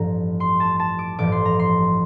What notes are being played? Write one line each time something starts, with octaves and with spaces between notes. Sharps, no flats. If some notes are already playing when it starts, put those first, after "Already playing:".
Already playing: A1 G2 F3 A#5
C6
A5
A5
D6
A1 G2 F3 D6
C6
A#5
C6